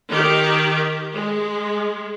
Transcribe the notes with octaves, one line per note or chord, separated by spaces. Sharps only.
D#3 G4
G#3